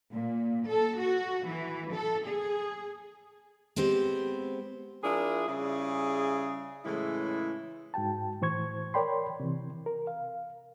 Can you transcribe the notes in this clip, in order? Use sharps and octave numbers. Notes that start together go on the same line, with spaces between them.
A#2
A4
F#4
E3
A4
G#4
G#3 B3 C4 G4 C5
F3 D4 E4 G#4 A#4
C#3 G3 E4 G#4
A2 C#3 E3 G#3 E4
G#2 F#4 G5 A5
A2 E3 C5 C#6 G#6
A#4 C#5 D5 G5 B5 C6
C3 E3
A#4
F5